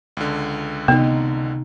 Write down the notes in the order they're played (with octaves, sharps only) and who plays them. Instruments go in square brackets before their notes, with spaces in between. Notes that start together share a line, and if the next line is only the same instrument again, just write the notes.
[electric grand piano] C#2 D3
[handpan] C3 D#4 [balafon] B3